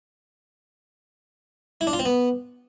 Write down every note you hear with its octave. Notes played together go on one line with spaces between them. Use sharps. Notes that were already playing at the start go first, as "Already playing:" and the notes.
E4
D4
F4
C4
B3